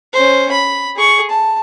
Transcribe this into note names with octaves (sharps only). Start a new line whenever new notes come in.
C#4 C5
B5
G#4 C#6
A5